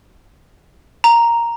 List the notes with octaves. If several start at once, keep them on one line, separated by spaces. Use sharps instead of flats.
A#5